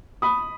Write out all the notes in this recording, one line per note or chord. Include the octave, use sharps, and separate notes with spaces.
B5 D#6